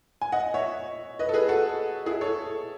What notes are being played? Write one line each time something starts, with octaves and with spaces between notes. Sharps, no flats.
G#5
D#5 F#5
C#5 E5
B4 D#5
A4
G#4 B4
F#4 A4
E4 G#4
A4 C#5